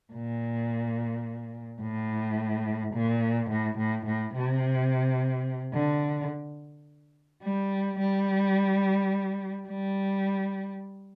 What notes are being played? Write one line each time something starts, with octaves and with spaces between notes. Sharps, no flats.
A#2
A2
A#2
A2
A2
A2
C3
D3
G3
G3
G3